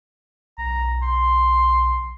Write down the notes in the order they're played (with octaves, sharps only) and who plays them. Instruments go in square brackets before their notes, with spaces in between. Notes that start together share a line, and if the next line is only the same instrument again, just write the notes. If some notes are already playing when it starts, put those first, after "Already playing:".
[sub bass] B1 [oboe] A#5
[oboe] C6